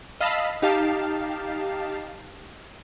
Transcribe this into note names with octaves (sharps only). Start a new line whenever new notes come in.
D#5 F5 A5 B5 E6
D#4 G4 F5 A5